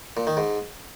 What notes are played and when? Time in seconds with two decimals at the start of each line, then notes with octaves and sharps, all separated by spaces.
0.17 A#2
0.27 D#3
0.37 G#2